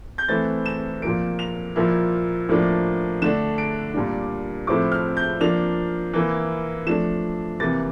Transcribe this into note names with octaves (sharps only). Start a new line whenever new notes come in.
G6
E3 A3 C4 E4 A6
E7
A#2 F3 A#3 D7
F7
A#2 F3 A#3 E4
A2 F3 A#3 D4
D3 A3 D4 E7
D7
A#2 G3 A#3 D4
A2 F3 A3 C4 E4 D6
F6
G6
F3 A#3 D4 F7
E3 A#3 E4
F3 A3 D4 E7
C3 E3 A#3 A6